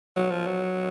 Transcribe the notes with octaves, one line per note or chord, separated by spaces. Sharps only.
F#3
F3
F#3